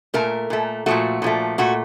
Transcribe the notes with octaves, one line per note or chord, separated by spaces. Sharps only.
A#2 A3 A#4
A#2 A3
A#2 F3 A3 F#4
A#2 F3 A3
A#2 A3 F#4